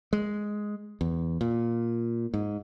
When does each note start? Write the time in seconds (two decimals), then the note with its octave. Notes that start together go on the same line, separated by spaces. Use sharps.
0.13 G#3
1.01 E2
1.41 A#2
2.34 G#2